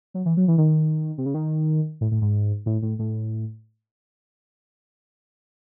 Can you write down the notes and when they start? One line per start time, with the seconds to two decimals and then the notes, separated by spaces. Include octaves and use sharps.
0.14 F#3
0.26 E3
0.37 F#3
0.48 E3
0.58 D#3
1.18 C3
1.26 C#3
1.34 D#3
2.01 A2
2.11 A2
2.22 G#2
2.66 A2
2.82 A2
2.99 A2